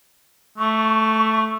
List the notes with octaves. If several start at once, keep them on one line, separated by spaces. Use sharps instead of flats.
A3 C#6